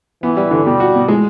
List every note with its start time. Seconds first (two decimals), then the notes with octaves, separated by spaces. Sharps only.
0.23 E3 B3
0.37 G3
0.51 D3
0.65 B2 G3
0.80 F#4
0.95 B2
1.08 G#3